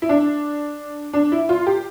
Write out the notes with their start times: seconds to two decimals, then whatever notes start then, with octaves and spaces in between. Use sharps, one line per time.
0.02 E4
0.09 D4
1.13 D4
1.32 E4
1.49 F4
1.66 G4